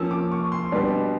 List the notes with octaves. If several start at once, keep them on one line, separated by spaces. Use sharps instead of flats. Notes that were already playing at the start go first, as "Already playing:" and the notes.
Already playing: F3 A#3 C#4 E6
D6
C#6
C6
B2 G3 B3 D4